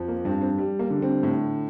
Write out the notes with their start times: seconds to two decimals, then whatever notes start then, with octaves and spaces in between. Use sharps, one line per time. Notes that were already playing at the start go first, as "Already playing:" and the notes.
Already playing: F2 F3
0.08 A#3
0.25 G2 C4
0.41 C4
0.58 G3
0.79 A#3
0.90 D3
1.02 C4
1.23 A2